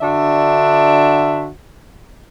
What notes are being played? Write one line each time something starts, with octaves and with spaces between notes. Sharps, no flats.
D3 D4 F#4 E5